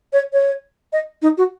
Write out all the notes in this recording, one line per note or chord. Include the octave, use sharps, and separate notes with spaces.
C#5
C#5
D#5
D#4
F#4